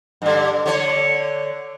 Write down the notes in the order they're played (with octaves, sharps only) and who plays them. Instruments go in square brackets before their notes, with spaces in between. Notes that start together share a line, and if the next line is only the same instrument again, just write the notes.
[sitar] G2 D3
D3 C#5